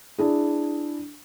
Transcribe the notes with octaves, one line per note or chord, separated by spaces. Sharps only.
D4 E4 G#4